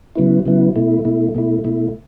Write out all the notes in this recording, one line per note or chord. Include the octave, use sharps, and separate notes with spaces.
C#3 F#3 B3 E4
C#3 F#3 B3 E4
B2 A3 E4
B2 A3 E4
B2 A3 E4
B2 A3 E4